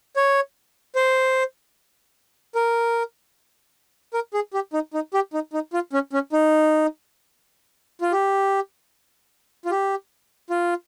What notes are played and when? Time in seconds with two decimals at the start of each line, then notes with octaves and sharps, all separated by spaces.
0.16 C#5
0.96 C5
2.55 A#4
4.14 A#4
4.34 G#4
4.54 G4
4.73 D#4
4.94 D#4
5.14 G4
5.33 D#4
5.53 D#4
5.73 F4
5.93 C#4
6.13 C#4
6.33 D#4
8.01 F4
8.12 G4
9.65 F4
9.71 G4
10.50 F4